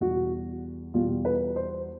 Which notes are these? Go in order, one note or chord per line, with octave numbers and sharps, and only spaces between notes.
E2 B2 G3 F#4
E2 B2 G3 F4
B4
C5